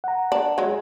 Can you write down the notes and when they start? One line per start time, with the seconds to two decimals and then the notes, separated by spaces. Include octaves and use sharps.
0.04 F#5 A#5
0.32 D4
0.58 F#3 G#3